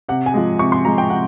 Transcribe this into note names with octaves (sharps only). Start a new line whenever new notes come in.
C3 F#5
G#5
F3 G#3
C3 C#6
C6
F3 G#3 A#5
G5
C3 F#5